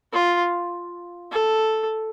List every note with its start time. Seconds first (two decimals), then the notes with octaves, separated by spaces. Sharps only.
0.13 F4
1.32 A4